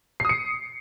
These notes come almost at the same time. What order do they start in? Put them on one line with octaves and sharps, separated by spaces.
C7 D#6 C#7